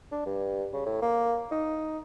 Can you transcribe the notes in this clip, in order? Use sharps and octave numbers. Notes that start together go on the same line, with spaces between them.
D4
G2
C#3
A2
A#3
D#4